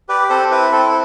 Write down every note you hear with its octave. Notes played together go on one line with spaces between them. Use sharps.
G4 B4 D5
C4 A4 C5
E4 B4
C4 A4